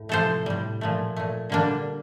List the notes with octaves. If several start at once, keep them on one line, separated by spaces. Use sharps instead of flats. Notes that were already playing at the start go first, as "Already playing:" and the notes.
Already playing: A2
C3 F3 A3 A4 C5
A2 G3
A#2 F3 A3
A#2 A3
D3 G3 A#3 D4